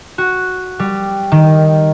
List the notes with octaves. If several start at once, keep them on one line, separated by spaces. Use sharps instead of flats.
F#4
G3
D#3